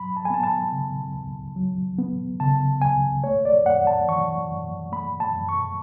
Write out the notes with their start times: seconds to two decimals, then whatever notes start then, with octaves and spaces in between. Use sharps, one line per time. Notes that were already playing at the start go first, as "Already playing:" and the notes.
Already playing: F#3 B5
0.17 A5
0.25 G#5
0.30 B3 A5
0.43 A5
0.72 C#3
1.13 C#2
1.56 F#3
1.98 B3
2.40 C#3 A5
2.82 C#2 G#5
3.24 A3 C#5
3.45 D5
3.66 F#2 F#5
3.87 A5
4.08 E3 C#6
4.50 F#2
4.92 A3 B5
5.20 A5
5.34 F#2
5.49 C#6